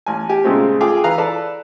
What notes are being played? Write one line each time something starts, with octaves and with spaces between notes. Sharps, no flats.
A1 G#5
G4 G#5
A#2 C#3 G#3 A3 C4
F4 G#4 A4 F5 G5 D6
E3 B4 F5 A#5 F#6
A4 B4 D5 A5 A#5